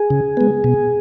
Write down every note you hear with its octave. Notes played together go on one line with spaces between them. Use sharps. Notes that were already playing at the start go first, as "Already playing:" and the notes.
Already playing: G#4
C#3
G#3 B3
B2